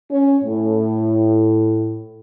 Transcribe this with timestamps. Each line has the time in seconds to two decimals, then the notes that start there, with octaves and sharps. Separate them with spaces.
0.10 C#4
0.44 A2